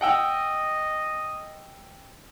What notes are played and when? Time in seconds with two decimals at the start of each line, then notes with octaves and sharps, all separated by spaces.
0.01 D#5 F#5 G5 E6